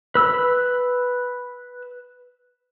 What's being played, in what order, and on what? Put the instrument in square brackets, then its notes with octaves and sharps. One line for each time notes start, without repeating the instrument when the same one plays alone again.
[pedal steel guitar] B4 E6